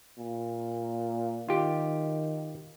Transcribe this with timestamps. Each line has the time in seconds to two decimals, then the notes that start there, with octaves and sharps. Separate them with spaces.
0.18 A#2
1.49 D#3 F4 G4